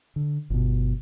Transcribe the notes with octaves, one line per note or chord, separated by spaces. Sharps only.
D3
G1 B2